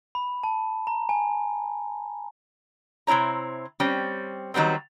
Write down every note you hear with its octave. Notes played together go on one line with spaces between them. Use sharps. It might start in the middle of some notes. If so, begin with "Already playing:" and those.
B5
A5
A#5
G#5
C3 C4 E4 C#5 A#5
G3 C4 C#4
D#3 F#3 G3 B3 C4